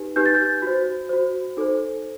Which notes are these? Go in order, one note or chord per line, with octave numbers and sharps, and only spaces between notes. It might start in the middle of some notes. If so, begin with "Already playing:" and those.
Already playing: D#4 G4 B4
D#4 G4 B4 G6
A6
G6
F#4 C5
F#4 C5
D#4 A4 C5